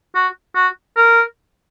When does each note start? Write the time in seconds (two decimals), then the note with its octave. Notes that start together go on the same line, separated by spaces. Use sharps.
0.15 F#4
0.55 F#4
0.97 A#4